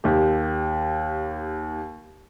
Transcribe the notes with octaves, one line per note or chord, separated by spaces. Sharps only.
D#2 G4